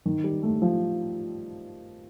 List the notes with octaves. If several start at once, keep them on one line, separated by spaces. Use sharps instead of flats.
D#3
G3
A3
F3